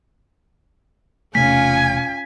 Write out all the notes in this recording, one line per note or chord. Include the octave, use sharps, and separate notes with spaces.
E1 C3 A3 C#4 F4 G#5 B6